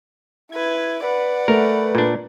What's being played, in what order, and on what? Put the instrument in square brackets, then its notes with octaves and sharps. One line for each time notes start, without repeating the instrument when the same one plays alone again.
[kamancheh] E4 B4 [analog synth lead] G#6
[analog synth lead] B4 [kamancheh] D5 F#5
[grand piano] A3 [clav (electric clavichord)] A#4
[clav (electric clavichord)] A#2 D4